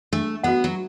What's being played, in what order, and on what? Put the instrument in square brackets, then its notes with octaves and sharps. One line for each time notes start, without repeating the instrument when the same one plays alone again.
[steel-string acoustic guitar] A3 [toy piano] D4
[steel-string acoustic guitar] B3 [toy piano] F#4 A4 F#5
[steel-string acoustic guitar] F#3